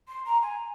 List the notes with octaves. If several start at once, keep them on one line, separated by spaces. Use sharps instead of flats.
C6
A#5
G#5